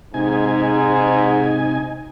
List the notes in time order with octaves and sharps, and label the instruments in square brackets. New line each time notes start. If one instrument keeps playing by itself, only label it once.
[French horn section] G#2 [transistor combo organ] C3 D#4 G#5